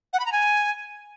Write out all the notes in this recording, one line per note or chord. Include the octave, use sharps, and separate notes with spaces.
F#5
B5
A#5
G#5